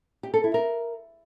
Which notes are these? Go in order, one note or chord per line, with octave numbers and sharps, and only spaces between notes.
G4
A4
E4
A#4